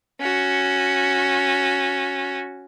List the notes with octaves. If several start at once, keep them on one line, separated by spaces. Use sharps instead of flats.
C#4 F#4